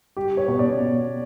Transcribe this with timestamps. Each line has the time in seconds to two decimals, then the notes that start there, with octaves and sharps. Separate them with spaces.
0.16 G3 G4
0.37 C#5
0.48 B2
0.59 D5
0.80 B2